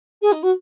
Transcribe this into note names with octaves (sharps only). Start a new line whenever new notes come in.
G#4
D#4
F#4